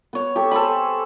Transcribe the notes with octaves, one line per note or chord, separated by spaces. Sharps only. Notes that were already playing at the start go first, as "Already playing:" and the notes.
B3 C#5
G4 A4 C#6
A4 C5 G#5 B5